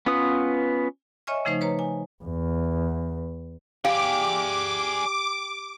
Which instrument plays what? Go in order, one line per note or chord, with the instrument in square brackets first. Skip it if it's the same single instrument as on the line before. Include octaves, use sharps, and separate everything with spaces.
[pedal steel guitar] B3 C#4 F4 B4 D#6
[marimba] C#5 D#5 E5 G#5 C#6 F6
C#3 F3 A3 D#4 C5
B4 C#5 A#5
G#5
[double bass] E2
[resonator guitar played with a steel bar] G4 [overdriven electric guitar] G#4 D5 [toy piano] F5 [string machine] D6